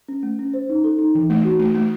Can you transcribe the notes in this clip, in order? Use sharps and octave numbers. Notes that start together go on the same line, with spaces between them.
C#4
A3
C#4
C5
D#4
A4
D#4
E3
A3
F#4
A3
A3